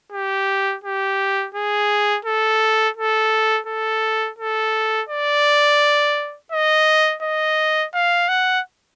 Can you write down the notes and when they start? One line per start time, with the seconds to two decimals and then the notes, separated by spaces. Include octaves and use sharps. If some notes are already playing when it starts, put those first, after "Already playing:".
0.12 G4
0.84 G4
1.55 G#4
2.25 A4
2.97 A4
3.67 A4
4.39 A4
5.09 D5
6.52 D#5
7.23 D#5
7.94 F5
8.29 F#5